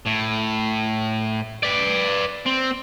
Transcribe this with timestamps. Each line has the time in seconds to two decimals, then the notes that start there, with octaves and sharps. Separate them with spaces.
0.06 A2
1.63 B4 D5
2.46 C4